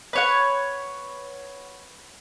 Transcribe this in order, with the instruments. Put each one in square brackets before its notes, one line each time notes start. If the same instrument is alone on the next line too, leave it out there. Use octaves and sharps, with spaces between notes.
[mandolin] B4 C#5 F#5